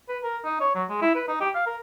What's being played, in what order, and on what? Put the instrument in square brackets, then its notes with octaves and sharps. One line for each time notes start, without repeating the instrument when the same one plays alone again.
[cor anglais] B4
A#4
D#4
C#5
F#3
G#3
E4
B4
D#4
G4
F5
A#4